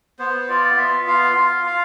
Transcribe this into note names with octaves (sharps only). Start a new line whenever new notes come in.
B3 C5
F4 D5
B3 E5
F4 F5
F4
F4